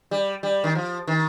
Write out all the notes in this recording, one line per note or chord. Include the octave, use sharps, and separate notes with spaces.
G3
G3
D#3
F3
D#3